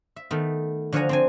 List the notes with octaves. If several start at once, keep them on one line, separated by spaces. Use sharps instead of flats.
E5
D#3 A3 B3
D3 F3 C#5 F#5 G#5 A#5
C4 D4 G#5